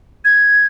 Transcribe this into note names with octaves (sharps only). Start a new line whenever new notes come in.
G#6